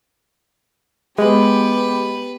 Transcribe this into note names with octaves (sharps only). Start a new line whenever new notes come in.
G#3 B3 G4 B4